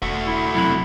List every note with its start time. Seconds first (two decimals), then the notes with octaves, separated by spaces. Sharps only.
0.02 E1 A3 F#4
0.27 E4
0.55 F#2 C3 F#3 E4